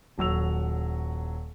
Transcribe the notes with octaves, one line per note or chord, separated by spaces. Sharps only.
D#1 F#3 E6 F7